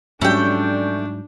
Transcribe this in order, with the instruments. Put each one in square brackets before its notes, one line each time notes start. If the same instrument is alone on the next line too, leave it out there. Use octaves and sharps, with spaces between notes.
[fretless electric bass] G#2 F#3 [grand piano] G3 C#4 [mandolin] A3 G5 [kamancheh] D4